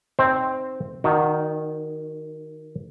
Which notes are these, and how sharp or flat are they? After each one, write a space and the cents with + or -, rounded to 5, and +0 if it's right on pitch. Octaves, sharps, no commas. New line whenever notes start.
C4 +0 D#4 +0 C5 +0
D#3 +0 D#4 -45 F#4 +5